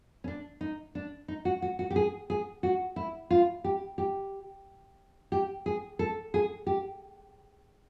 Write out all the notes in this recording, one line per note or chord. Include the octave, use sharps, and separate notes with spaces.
C#4
D4
D#4
D4
D#4
F#4
F#4
F#4
G4
G#4
G#4
F#4
E4
F4
G4
G4
G4
G#4
A4
G#4
G4